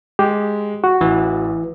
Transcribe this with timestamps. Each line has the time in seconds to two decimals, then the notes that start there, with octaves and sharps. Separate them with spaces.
0.19 G#3 G4
0.84 F#4
1.01 A1 E3